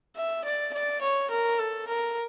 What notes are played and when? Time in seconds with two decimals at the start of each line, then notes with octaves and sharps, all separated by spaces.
0.16 E5
0.45 D5
0.74 D5
1.02 C#5
1.31 A#4
1.59 A4
1.88 A#4